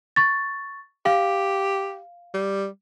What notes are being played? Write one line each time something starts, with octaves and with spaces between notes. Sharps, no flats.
C#6 A6
G4 F5
G3